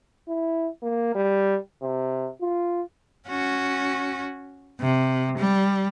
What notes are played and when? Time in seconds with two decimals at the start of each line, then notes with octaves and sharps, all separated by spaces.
0.28 E4
0.83 A#3
1.15 G3
1.82 C3
2.41 F4
3.28 C#4 F#4
4.81 C3
5.38 G3